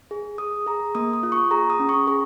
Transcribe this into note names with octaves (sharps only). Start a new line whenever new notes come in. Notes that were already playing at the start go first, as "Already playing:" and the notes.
G#4
G#4 D#6
G#4 A#5
A#3 D#6
D#6
F4
C#6
G#4 A#5
D#6
C#4
C#6
G#4